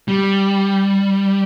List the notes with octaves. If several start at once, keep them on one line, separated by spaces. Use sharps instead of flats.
G3